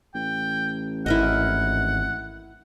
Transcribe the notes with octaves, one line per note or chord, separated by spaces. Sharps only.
A1 G5
G#1 E4 A#4 D#5 F#5